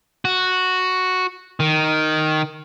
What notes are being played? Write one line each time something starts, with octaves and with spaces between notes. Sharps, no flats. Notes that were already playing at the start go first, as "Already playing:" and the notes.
F#4
D#3